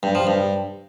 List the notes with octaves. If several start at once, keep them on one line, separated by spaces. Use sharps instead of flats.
G2
F3
G2